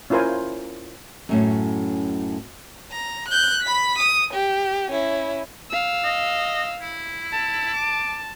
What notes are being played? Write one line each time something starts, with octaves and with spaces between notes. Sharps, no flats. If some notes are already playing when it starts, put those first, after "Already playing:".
C#4 E4 F4 A#4 C5 G#5
F#2 A2 C#4
A#5
F#6 G6
B5 B6
D#6
G4
C#4 E4
F5 E6
D#5
E4
A5
D6